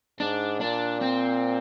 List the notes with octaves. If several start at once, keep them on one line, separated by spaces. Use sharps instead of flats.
G#2 D4
A#2 D4
C4